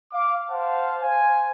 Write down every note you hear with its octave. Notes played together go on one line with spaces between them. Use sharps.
F5 D6
C5 F5 F#5 A5
C5 F5 G#5